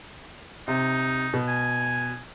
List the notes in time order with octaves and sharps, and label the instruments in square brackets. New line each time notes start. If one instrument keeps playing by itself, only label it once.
[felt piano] C3 [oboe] D#4
[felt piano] B2
[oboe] G#5